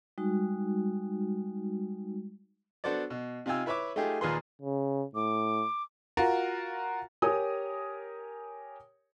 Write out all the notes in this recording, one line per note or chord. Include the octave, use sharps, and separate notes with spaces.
G3 G#3 D#4 F#4
B3 D4 F#4 A4 C5 D5
B2
C3 D#4 F4 G5 G#5 E6
E4 B4 C#5 E5 D6
A3 D#4 F4 G4 G#4
D#2 A#2 F4 G#4 B4 C6
C#3
A2 D6
F4 F#4 A#4
G4 A#4 C#5 G#5 D#6